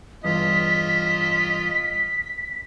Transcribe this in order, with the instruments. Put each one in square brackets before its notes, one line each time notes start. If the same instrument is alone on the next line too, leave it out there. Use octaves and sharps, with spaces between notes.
[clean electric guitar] E2 G2 [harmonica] F4 D#5 [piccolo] B6